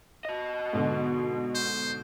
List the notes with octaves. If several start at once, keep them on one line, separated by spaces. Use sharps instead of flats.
F#4 D#5
G#2 B2 D3
C5